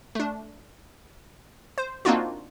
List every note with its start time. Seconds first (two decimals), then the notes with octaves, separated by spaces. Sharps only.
0.15 A3 D4
1.78 C5
2.05 A#3 C4 D4 D#4 F4 F#4